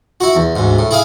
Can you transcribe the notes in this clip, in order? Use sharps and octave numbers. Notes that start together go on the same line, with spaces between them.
E4 F#4
E2
D2 G#2
A2
E4 G#4 F5